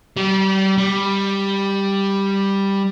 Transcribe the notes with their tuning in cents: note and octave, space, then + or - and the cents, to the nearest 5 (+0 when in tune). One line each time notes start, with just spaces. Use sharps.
G3 -30
G3 +5